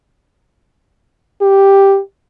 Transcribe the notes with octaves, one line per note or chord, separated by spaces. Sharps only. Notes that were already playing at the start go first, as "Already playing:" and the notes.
G4